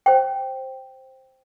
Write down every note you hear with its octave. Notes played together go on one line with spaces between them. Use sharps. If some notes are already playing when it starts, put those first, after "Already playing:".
C5 G5